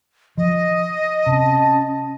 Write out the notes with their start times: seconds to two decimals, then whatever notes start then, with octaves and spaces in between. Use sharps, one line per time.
0.37 F3 D#5
1.26 C3 C#4 A5